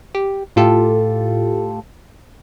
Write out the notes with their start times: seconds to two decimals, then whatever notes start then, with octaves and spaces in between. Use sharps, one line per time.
0.15 G4
0.56 A2 F4 G4 A4